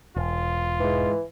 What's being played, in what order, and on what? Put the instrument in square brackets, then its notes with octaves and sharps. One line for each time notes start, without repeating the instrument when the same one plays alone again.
[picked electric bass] E1 [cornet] F4
[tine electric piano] G#2 G#3 [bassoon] E3